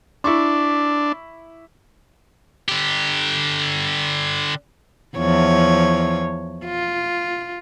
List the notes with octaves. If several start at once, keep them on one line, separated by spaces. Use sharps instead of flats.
D4 E4 C#6 D6
D3 G4
E2 F3 C#5
F4